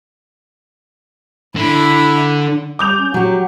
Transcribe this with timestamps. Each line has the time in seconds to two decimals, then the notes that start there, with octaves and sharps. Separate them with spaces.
1.56 D3 E4 B5
2.79 G3 D6 G6 F7
2.98 C#4
3.14 F#3 G4 F#5